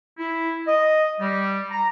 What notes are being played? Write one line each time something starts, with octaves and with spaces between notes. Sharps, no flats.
E4
D#5
G3
A#5